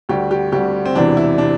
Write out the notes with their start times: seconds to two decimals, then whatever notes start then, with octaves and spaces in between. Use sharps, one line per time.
0.09 D2 D3 G3 G4
0.31 G4
0.52 D2 D3 G3 G4
0.86 C4
0.95 E1 E2 C3 E3 D4
1.17 E4
1.38 C3 D4